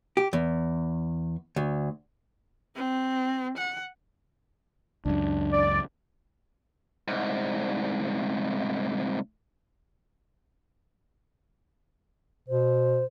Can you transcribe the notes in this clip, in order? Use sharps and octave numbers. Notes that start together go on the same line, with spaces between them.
G4
E2
D2
C4
F#5
C#2 F#2 D4
D5
C2 G#2
B2 C5